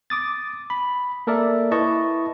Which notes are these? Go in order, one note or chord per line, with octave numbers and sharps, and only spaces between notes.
D6 D#6 A6
B5
A#3 A4 A#4 D5 E5
E4 B4 D#5 A5 C#6